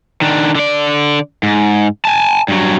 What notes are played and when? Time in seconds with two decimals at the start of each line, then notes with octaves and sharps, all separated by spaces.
0.21 D#3 D4
0.55 D3 D5
1.43 G#2
2.05 G#5 A5
2.48 G2 F#3